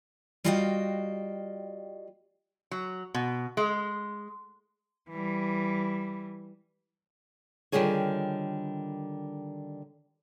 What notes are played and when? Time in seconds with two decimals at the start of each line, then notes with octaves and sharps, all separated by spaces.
0.44 G3 F4 F#4 D#5 F5 G5
2.71 F#3
3.14 B2
3.57 G#3
5.10 E3 G3
7.72 D3 D#3 G3 F4 G#4 C#5